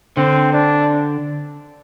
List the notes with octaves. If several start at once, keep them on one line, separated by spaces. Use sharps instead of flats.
D3 C4
D4